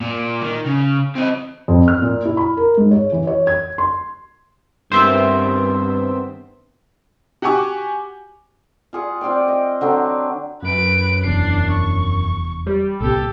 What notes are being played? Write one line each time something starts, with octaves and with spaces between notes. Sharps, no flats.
A#2
D#3
C#3
C4 D#5
F2
F6
A#2
E4
B5
A#4
G#2
C#5
E3
C#5
G#6
C6
G2 D#3 B3 C4 C5 E5
F#4 G4 F#5 G#5 C#6 D6
F4 G#4 F#5
C4 F4 D5 G5
D#5
D3 F#3 C4 D4
F#2 B4 D7
F1 E2 D4 C7
C#6
G3
C2 A#2 B3 G4 A4